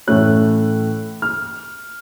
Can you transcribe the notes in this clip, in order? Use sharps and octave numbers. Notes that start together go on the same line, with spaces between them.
A2 E3 A3 C#4 F#6
F6